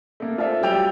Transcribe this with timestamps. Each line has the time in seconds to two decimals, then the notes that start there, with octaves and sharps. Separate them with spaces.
0.20 A3 A#3
0.38 F4 A4 C5 D5 E5
0.61 F#3 G3 G4 G5 E6 F7